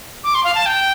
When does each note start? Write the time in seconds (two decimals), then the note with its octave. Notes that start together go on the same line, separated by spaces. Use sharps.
0.24 D6
0.34 C6
0.44 F5
0.55 A5
0.66 G5